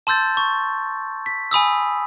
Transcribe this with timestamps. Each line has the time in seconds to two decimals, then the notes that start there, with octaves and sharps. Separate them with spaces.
0.07 A5 C6 E6 G6 A6
0.37 C#6
1.26 B6
1.51 G#5 B5 D#6 E6